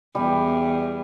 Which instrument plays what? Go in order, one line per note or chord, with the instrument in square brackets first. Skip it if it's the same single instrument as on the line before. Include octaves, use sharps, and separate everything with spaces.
[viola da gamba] E2 [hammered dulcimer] G3